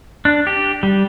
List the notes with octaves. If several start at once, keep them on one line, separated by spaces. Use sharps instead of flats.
D4
G4
G3